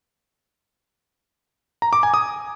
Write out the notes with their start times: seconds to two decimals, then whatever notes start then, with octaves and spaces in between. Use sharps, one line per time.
1.82 A#5
1.93 D6
2.03 G#5
2.14 D#6